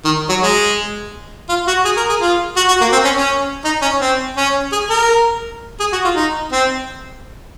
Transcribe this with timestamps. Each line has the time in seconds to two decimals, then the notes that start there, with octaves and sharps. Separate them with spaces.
0.05 D#3
0.29 F#3
0.41 G#3
1.49 F4
1.67 F#4
1.85 G#4
1.97 A#4
2.09 G#4
2.21 F4
2.56 F#4
2.68 F#4
2.81 A#3
2.92 C4
3.05 C#4
3.17 C#4
3.65 D#4
3.82 C#4
4.01 C4
4.37 C#4
4.72 G#4
4.90 A#4
5.80 G#4
5.93 F#4
6.05 F4
6.15 D#4
6.52 C4